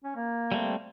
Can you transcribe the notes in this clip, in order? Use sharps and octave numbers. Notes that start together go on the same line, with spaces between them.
C#4
A#3
G3 A3 C4